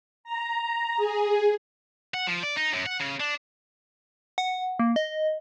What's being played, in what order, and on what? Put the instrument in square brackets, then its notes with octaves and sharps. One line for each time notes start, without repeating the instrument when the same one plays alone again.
[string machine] A#5
G#4
[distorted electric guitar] F#5
F3
D5
D#4
F#2
F#5
C#3
D4
[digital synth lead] F#5
A#3
D#5